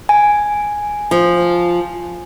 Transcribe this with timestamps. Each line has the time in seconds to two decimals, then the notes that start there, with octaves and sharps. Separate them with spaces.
0.09 G#5
1.11 F3